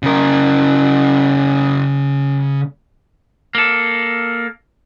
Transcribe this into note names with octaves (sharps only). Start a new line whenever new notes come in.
C#3 A#4
A#3 A4